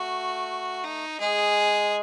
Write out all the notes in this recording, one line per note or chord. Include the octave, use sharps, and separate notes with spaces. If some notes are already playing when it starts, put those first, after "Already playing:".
Already playing: A3 F#4
D#4
G#3 G#4